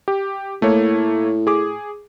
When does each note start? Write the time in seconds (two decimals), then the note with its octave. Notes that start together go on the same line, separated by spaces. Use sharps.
0.08 G4
0.62 A2 A3 A#3 C#5
1.47 G#4 D6